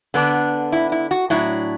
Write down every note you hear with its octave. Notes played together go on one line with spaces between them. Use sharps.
D3 B3 D4
E4
E4
F#4
A2 F#3 D4 E4